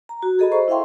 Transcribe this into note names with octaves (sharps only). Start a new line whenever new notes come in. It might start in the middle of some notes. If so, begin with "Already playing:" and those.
A#5
F#4
G#4 A4 D#5 A#5 B5
C5 C#6
E4 E5 F5 G5 C6